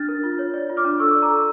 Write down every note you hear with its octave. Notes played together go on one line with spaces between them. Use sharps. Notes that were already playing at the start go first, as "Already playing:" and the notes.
Already playing: D4 F6 A6
A#4
F4
C#5
D5
F4
D6 F6
D4
A4 C#6 E6
D5
A#5 D6
A4